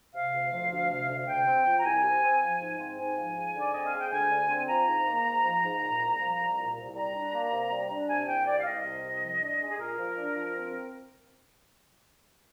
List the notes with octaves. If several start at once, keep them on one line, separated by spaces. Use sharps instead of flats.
C3 F5
D2
F3
D2
C3
D2
C3 G5
C4
F3
A#5
C2 G#5
C3
C4
F3
G#2
C4
G#2 G#5
F3
G#2
D3 D5
C4 D#5
F5
G#3
G5
D2 G#5
D3
C4
F3 A#5
G#2
A#3
G#2
F3
G#2
A#2
C2
F3
C2
A#2
C2
G3 A#5
D4
A#3
C3
G3
D4
C3 G#5
C2 G5
G3 D5
F5
C2 D#5
C3
C2
F3
D4
G#3
G#4
A#2 A#4
F3
D4
F3
C4